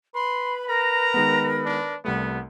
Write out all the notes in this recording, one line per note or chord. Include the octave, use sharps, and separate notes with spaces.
B4 B5 C6
A#4 A#5
D#3 G#3 B3
D4
C2 G3 A3 B3